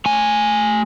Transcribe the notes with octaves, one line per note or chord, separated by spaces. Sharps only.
A3 G#5